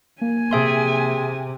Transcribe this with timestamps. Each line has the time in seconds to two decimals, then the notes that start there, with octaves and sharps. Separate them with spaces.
0.22 A#3 G#5
0.51 C3 G#4 E5 C6